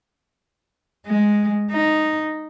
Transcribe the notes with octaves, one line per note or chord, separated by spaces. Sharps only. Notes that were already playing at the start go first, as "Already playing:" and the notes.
G#3
D#4